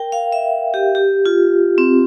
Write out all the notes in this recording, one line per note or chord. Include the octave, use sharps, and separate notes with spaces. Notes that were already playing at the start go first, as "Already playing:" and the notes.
Already playing: A#4 G5
F5
E5
G4
G4
F4
C4